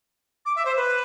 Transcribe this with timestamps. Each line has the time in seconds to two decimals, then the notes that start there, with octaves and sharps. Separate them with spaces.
0.45 D6
0.56 E5
0.65 C5
0.76 B4